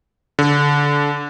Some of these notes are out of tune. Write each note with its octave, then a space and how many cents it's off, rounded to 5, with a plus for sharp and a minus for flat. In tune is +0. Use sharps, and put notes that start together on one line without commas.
D3 -25